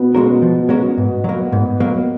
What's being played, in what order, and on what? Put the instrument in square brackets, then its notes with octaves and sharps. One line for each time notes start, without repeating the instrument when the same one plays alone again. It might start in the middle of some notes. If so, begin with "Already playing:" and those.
Already playing: [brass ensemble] B2 B3
[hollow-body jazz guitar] G#3 C#4 F#4 A#4
F3
G#3 C#4 F#4 A#4
[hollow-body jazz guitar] G#2 [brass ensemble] B2 B3
[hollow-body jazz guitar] F#3 A#3
G#2
F#3 A#3